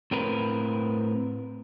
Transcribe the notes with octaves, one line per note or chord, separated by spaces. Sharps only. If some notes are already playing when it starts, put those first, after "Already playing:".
A2 C4 A#4 B4